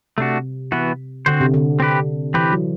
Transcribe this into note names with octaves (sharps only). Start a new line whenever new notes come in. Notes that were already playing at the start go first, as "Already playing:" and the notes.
C3 A3 D4 F#4
E3 B3 F#4
D3 C4 F#4 C5
C3
D3
C4 G4 B4
E3 C4 G4 B4
F#3